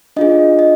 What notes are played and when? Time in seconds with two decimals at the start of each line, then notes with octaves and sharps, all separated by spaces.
0.16 D4 F4 G#4 D#5
0.59 D#5